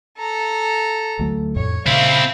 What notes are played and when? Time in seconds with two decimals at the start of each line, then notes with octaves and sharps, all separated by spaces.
0.17 A4 A#5
1.19 D2 F#3 A3
1.56 F2 A2 C#5
1.86 A#2 C#3 C4 E4 F5 B5